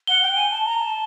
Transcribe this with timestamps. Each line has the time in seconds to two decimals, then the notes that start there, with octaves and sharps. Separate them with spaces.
0.07 F#5 G7
0.23 G5
0.36 G#5
0.50 A5
0.65 A#5
0.79 A5